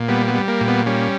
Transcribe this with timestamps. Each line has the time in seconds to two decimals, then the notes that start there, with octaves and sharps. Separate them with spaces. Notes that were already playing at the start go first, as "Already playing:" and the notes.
Already playing: A#2
0.08 G3 B3
0.28 B3
0.34 G3
0.48 A#3
0.61 A#2
0.67 B3
0.86 G3 C#4